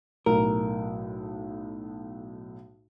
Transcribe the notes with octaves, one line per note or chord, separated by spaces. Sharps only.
B1 A2 A#4